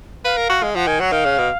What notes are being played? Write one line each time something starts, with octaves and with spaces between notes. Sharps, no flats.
B4 F5
A#4
F#4
G#3
F3 F#5
D#3 G#5
F#3 F#5
D#3 F5
C#3
B2